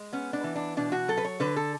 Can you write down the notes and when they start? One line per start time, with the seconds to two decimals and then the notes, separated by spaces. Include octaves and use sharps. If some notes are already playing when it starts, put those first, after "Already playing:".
Already playing: G#3
0.13 B3 C#4
0.33 D4
0.44 E3
0.56 D4
0.77 B2 D4
0.92 F#4
1.08 F#3 A4
1.18 B4
1.25 C#5
1.40 D3 B4
1.56 A4